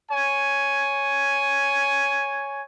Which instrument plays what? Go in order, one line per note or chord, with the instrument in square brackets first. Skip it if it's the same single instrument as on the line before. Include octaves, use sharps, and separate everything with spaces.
[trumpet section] C#5 G#5